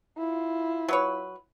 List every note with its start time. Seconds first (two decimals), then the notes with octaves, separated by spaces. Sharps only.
0.17 E4 F4
0.88 F#3 B4 C#5